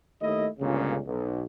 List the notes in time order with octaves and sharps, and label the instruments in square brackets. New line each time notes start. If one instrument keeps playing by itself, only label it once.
[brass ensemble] D#2 A3 E4 D#5
G1 C#2 A#2 C#3
B1